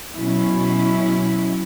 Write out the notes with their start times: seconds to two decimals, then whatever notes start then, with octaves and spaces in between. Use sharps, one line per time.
0.15 B2 F#3 C#4 E4